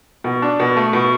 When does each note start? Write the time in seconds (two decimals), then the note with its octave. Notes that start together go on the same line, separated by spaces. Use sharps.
0.24 B2
0.42 D4
0.60 B2
0.77 A3
0.93 B2